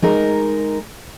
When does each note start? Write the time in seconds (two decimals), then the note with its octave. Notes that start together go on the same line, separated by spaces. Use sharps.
0.02 G#3 D#4 A#4